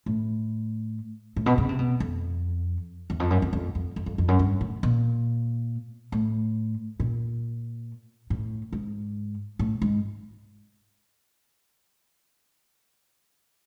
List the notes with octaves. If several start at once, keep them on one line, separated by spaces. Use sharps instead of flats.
A2
A2
B2
C#3
C3
B2
F2
E2
F2
F#2
F2
F2
F2
F2
F2
F2
F#2
G2
A2
A#2
A2
A#2
A2
G#2
A2
G#2